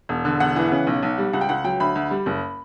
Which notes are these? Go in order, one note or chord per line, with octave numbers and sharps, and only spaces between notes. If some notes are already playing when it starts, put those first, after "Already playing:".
E1
D3
E1 F#5
E3
C#3
B1
B1
G3
C#2 F#5
G5
C#2 F#5
F#3 G5
D2 B5
D2
G3
F#1